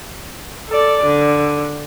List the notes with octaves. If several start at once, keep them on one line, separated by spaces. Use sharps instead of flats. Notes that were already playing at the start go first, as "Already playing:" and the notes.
A4 D5
D3